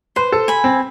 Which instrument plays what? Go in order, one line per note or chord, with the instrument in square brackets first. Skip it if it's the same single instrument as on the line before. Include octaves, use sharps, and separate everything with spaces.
[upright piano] B4 [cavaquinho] C5
[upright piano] A4
[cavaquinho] G#5 B5
[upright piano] C4